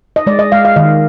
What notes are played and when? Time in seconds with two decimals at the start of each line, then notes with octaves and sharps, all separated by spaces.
0.16 D#5
0.27 G#3 D5
0.39 D#5
0.52 G#3 F5
0.65 F5
0.76 D#3 D#5